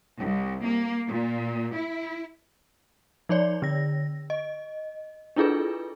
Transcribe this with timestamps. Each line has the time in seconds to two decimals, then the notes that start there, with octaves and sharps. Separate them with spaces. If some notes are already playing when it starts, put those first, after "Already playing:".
0.20 C2
0.66 A#3
1.08 A#2
1.76 E4
3.29 F3 D#4 C#5 D5
3.62 D3 A#6
4.30 D#5
5.36 D4 E4 F4 G#4 A4 B4